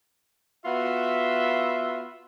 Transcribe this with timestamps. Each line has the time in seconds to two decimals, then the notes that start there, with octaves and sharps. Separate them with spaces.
0.65 B3 F4 F#4 E5